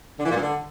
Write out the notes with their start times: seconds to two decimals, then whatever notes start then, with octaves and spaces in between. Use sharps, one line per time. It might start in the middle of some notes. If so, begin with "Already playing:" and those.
0.19 D3
0.25 E3
0.30 A#2
0.36 G2
0.42 D3